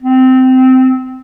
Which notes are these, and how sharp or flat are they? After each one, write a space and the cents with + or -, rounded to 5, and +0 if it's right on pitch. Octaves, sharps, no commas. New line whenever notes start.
C4 -15